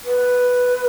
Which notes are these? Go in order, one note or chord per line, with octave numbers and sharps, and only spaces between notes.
B4